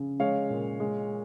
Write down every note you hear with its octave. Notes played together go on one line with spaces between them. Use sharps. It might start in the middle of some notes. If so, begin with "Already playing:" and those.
Already playing: C#3
G#3 C#5 F5
A#2
G#3